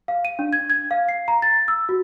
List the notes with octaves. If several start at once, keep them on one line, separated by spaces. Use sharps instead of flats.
F5
D#7
D4
G#6
G#6
F5
C7
A#5
A6
E6
F#4